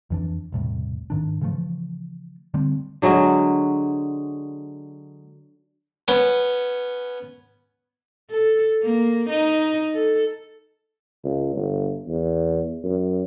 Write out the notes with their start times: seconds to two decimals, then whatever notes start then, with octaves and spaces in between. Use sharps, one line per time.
0.10 F2 E3 D4
0.52 E1 C2 A2
1.10 G#2 D#3 D4
1.41 C#3 E3 F3 A3
2.54 D3 G3 A3 C4
3.02 D3 F#3 G#3
6.08 B3 C#4
8.30 A4
8.83 A#3
9.29 D#4
9.94 A4
11.24 C#2
11.55 G1
12.08 E2
12.84 F#2